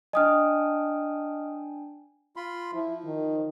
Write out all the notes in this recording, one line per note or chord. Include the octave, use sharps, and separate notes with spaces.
D4 D#5 G5 G#5 D#6 F6
F4 B5 C6
F3 E4
D#3